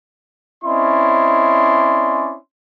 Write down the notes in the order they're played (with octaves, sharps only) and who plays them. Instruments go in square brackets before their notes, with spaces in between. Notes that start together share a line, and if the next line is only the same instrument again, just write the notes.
[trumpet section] C4 C#4 E4 D5 D#5 C6